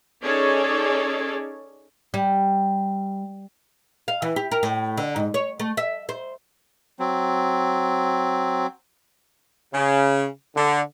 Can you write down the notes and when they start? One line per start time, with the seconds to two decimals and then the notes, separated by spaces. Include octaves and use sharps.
0.23 C#4 D#4 G#4 A4 C#5 D5
2.14 G3
4.08 F5
4.22 E3
4.36 G4
4.51 A#4
4.63 A2
4.97 D3
5.16 G#2
5.34 C#5
5.59 A3
5.77 E5
6.09 C5
6.99 F#3 C4
9.74 C#3
10.56 D3